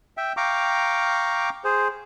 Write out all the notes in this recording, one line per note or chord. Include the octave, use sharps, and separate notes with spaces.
E5 G5
F5 G5 A#5 C#6 D6
G#4 C5